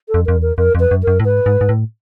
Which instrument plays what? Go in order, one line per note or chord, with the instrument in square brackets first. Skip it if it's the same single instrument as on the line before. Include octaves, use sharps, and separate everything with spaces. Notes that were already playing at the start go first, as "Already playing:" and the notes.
[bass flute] A4
[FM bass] F2
[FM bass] F2 [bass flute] A#4
[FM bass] E2
[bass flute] A#4
[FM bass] F2 [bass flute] A#4
[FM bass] F2
[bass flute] B4
[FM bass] F#2
[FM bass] F#2 [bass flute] A#4
[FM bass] A2
[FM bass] G#2 [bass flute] B4
[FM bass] G#2
G#2
A2